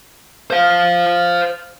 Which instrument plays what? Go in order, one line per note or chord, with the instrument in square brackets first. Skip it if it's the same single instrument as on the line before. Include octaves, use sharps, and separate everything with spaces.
[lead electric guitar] C5 F5